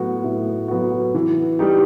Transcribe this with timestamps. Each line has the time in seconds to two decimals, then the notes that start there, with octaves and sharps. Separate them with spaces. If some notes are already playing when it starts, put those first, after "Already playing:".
Already playing: A2 F#3 B3 F#4
0.24 A2
0.68 F#3 B3 F#4
1.15 E3
1.59 G3 D#4 G4